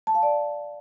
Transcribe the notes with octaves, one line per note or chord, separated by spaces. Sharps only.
A5
F5
D5